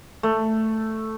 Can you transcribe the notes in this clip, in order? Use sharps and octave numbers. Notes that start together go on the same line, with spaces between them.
A3